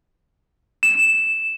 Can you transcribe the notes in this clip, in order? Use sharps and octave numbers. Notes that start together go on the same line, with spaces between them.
E7